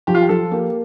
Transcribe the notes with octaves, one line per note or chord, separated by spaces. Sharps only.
F3 G4
F4
G4
F3 A4
A#3 G4